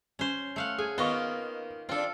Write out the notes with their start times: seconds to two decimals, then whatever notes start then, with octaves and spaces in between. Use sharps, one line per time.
0.19 C#4 C5
0.56 A3 F5 F#5
0.79 G#4 G#5
0.98 D#3 A#3 B3 F4 D#5 C#6
1.89 C4 D4 F4 A4